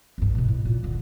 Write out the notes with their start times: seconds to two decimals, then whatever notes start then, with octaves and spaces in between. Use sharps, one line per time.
0.18 E2 G2
0.35 B2 G#3
0.48 A2
0.65 A#2
0.83 E1 D3